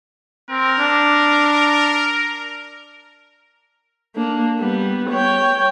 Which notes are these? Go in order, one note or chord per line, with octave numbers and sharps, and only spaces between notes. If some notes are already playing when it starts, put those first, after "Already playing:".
C4 A#4
D4
A#3 D4
G3 B3
C#5 G5